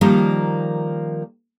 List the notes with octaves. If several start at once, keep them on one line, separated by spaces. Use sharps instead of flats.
D#3 F3 G3 A#3 A#4